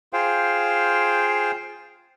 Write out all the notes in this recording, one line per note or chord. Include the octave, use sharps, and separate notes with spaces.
F4 G#4 C5 F5 G5